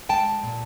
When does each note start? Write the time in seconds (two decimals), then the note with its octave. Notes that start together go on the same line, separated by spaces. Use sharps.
0.09 G#3 G5 A5
0.44 A#2